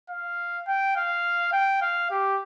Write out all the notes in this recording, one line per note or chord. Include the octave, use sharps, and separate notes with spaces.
F5
G5
F5
G5
F5
G4